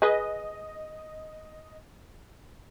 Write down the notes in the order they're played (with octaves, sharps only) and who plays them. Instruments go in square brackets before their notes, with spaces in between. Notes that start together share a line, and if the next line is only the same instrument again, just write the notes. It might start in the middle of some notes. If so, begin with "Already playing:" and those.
[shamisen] G#4 B4 [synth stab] D#5